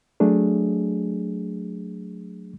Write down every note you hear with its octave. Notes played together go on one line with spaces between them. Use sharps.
F#3 A3 D4 G#4